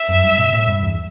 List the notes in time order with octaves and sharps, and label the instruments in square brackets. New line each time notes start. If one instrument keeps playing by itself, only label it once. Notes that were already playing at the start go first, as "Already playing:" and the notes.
Already playing: [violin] E5
[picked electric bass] F#2
G2
B2
A2
G2
E2